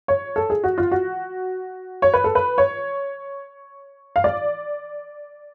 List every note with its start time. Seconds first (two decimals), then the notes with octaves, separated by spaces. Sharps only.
0.08 C#5
0.36 A4
0.50 G#4
0.64 F#4
0.78 F4
0.92 F#4
2.02 C#5
2.14 B4
2.24 A4
2.35 B4
2.58 C#5
4.16 F5
4.24 D5